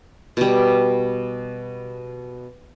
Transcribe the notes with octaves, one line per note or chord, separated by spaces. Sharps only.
B2 G3